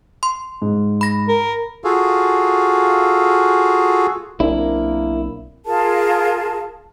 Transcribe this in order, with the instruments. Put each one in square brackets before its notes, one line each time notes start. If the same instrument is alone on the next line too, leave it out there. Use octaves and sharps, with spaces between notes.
[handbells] C6
[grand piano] G#2
[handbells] B5 A#6
[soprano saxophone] A#4
[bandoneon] F4 F#4 G#4 A4 F5
[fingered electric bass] B1 C4 D4 [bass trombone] A#3 [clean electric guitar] E4
[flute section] F4 G#4 A#4 A5